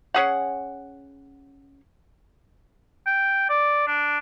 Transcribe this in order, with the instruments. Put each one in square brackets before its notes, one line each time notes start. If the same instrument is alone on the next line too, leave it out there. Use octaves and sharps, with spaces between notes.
[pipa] C#4 G#4 F#5
[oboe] G5
D5
D4